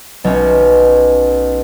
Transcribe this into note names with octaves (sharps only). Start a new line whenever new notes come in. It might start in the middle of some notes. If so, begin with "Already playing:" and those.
B1 C#4